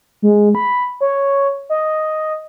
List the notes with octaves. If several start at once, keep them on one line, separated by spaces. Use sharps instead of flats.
G#3
B5
C#5
D#5